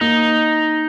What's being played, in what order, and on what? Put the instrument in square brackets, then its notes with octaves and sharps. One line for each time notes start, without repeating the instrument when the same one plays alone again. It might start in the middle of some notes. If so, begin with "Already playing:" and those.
[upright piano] A#3 [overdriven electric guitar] D#4